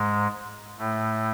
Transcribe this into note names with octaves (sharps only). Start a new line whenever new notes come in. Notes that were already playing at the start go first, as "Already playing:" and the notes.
Already playing: G#2 G#3
A2 A3